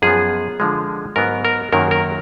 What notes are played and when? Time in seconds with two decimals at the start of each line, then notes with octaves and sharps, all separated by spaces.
0.02 F#2 F3 B3 G#4
0.60 D3 F3 G#3
1.16 G#2 F#3 B3 A#4
1.45 A#4
1.72 F#2 D#3 F#3 A#3 A#4
1.91 A#4